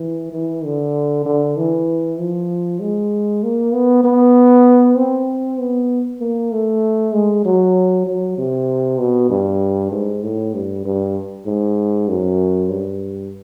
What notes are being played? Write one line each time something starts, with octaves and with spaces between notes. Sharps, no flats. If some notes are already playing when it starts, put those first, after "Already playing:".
Already playing: E3
E3
D3
D3
E3
F3
G#3
A#3
B3
B3
C4
B3
A#3
A3
G#3
F#3
F#3
C3
B2
G2
G#2
A2
G2
G2
G#2
F#2
G2